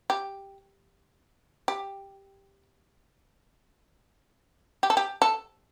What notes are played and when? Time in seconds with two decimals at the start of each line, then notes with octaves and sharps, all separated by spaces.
0.10 G4
1.68 G4
4.83 G4
4.90 A4
4.97 G4
5.22 A4